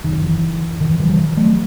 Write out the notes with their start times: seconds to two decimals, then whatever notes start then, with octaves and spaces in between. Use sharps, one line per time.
0.04 F#1 F#2 D#3
0.24 E3
0.81 D#3
0.90 E3
1.00 D#3 F#3
1.09 E3 G3
1.37 F#3 A3